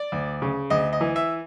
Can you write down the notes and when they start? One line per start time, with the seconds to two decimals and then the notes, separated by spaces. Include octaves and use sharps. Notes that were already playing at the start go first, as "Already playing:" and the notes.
Already playing: D5
0.12 D2
0.42 C#3
0.70 D2 D#5
0.93 D#5
1.01 E3
1.16 E5